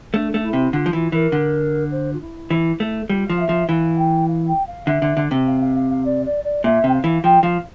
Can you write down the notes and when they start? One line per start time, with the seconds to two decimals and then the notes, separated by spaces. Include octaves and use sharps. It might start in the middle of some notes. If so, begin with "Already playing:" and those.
0.14 A3 D4
0.34 A3
0.43 E4
0.53 C3
0.73 D3 F4
0.86 F3
0.93 E3 F4
1.12 E3 A#4
1.32 D3
1.91 C5
2.13 F4
2.21 E4
2.51 E3
2.80 A3
3.09 G3 F4
3.28 F3 F5
3.39 E5
3.49 F3
3.69 E3 F5
3.98 G5
4.28 F5
4.47 G5
4.67 F5
4.87 D3 E5
5.02 D3
5.17 D3
5.31 C3
5.47 F5
5.61 F5
5.76 F5
5.90 F5
6.05 D5
6.25 D5
6.44 D5
6.64 A#2 E5
6.84 C3 G5
6.93 F5
7.04 E3
7.24 F3 G5
7.43 F3 F5